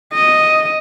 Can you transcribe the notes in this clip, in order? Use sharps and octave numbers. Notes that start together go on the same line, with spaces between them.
D#5